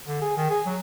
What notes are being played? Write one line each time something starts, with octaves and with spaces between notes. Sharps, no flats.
D3
G#4
D#3
G#4
F#3